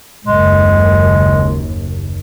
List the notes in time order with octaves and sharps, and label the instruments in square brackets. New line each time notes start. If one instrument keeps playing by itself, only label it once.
[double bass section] F#1 D#2 [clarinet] G#3